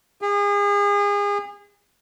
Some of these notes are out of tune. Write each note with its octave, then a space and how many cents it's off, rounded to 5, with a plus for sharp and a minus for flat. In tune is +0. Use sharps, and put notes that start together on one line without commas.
G#4 -35